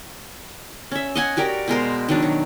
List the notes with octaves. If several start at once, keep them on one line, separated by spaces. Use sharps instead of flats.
C#4 E5
D#5 F#5 G#5
F#4 G4 A#4 D5
B2 G#3 A#4 C5
D#3 F#3 D4
F#3